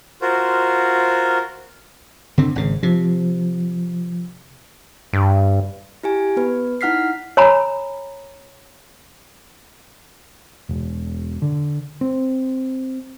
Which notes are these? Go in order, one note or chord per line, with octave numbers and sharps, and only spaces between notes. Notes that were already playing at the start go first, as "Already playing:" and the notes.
F4 F#4 A#4 C5
D3 C4
G#1 C#3
C3 F3
G2
E4 G4 G#5
B3 B4
D#4 E4 F#5 F6 B6 C7
C#5 G#5 A#5 B5
E1
D3
C4